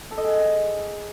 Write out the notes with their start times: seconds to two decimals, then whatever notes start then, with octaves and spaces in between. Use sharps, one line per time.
0.11 A4
0.18 D#5
0.24 G#4